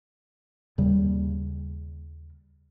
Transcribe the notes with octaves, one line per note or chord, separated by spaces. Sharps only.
D#2 C#3 G3